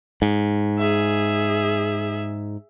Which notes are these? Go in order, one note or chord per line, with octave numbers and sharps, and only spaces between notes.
G#2
G#4 E5